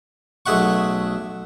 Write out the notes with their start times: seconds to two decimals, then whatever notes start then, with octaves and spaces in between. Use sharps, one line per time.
0.46 B1 A3 G#4 E5 F#5 C#6